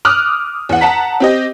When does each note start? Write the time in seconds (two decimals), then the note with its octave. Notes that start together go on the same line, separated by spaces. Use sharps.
0.05 D6 D#6 F6 F#6
0.69 E2 F#5
0.81 F#5 A5 A#5 B6
1.20 C4 G4 D#5